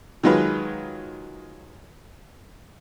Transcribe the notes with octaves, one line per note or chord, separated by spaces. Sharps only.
D#3 F#3 G#3 F4 B4